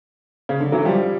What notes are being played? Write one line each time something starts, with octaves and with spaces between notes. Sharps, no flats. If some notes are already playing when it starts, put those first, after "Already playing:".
C#3
D3
E3 F#3
F3 G3